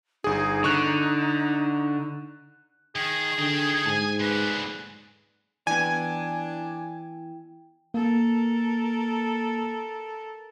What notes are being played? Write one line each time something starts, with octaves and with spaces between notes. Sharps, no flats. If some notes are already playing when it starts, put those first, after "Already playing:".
G1 D#4 G#4
D3 C#6 F#6
D#3 G#4
D3 D#4 G5
G#2 G#5 A5
D3 G#3 B4
E3 B3 D4 E4 G5 G#5
A#3 A4 A#4